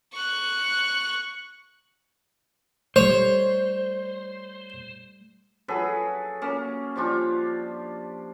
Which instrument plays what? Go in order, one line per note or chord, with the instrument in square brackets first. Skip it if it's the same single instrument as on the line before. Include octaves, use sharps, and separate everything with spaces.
[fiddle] C#6 F#6
[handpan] G3 A3 [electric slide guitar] C5 [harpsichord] C#5
[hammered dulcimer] F#3 G#4 A4 B4
A#3 C#4
F3 G3 D4 F4